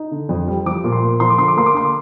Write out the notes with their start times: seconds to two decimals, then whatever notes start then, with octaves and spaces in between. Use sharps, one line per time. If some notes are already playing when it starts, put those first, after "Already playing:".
Already playing: D#4
0.11 D3
0.29 F2
0.48 G3
0.66 F3 D6
0.84 A#2
0.92 C6
1.02 A#3
1.20 F3 C6
1.30 D6
1.38 D3 C6
1.48 D6
1.57 A#3 C6
1.66 D6
1.75 D3 C6
1.86 D6